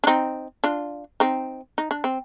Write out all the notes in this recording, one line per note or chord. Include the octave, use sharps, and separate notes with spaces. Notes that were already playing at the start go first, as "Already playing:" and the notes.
D4
C4 D#4
D4 F4
C4 D#4
D#4
D4
C4